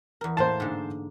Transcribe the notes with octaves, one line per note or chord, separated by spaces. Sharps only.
E2 A#4
A2 A#3 C5 A5
G#2 D3